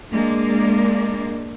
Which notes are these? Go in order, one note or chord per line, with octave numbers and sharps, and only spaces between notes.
G#3 A#3 D4